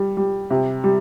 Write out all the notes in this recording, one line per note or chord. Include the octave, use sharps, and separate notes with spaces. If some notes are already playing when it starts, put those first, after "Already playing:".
Already playing: G3
G3
C3
G3